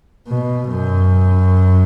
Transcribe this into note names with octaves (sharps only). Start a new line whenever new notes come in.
B2
F#2